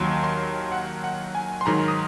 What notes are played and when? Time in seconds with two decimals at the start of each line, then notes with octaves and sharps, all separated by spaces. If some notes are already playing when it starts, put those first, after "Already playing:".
Already playing: D#2 D#3 F#3 C6
0.24 C6
0.72 F#5
1.04 F#5
1.35 G#5
1.61 C6
1.66 G#2 D#3 F#3 A#5
1.88 D#6